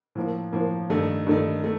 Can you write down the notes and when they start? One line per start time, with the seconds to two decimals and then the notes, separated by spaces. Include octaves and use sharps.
0.15 A2 F3 A#3
0.53 A2 F3 A#3
0.90 G2 D#3 A3 D#4
1.27 G2 D#3 A3 D#4
1.64 A3